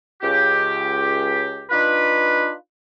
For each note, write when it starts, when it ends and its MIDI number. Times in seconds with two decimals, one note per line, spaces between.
0.22 1.65 37
0.22 1.65 67
1.70 2.51 62
1.70 2.51 63
1.70 2.51 65
1.70 2.51 71